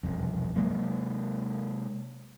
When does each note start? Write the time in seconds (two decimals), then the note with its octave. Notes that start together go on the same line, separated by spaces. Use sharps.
0.03 E1 C2 F2
0.56 C3 F#3 G#3 A#3